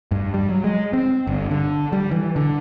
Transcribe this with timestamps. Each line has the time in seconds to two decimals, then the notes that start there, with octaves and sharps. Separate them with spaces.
0.11 G2
0.34 G3
0.49 F#3
0.64 G#3
0.93 C4
1.27 G1
1.51 D3
1.92 G3
2.11 E3
2.36 D3